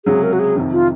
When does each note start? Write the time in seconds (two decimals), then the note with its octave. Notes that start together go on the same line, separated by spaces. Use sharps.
0.06 C#2 C3 F#3 G#4
0.23 A#4
0.33 F#4
0.39 G#4
0.55 F2 C3 D#3
0.73 F4